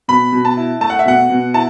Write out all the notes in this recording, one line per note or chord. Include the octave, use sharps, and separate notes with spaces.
B2 B5
B2
A5
E4
A3 A5
F#5
E5
B2 F#5
B2
E4 A5